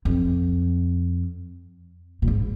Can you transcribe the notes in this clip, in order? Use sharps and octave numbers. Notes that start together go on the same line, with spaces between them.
F2
A#2
G#2